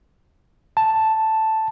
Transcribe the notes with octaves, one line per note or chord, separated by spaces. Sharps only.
A5